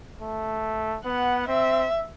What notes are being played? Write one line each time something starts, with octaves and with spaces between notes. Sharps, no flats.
A3
B3 F#5
C4 E5